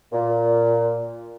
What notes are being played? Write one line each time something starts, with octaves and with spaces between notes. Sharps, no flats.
A#2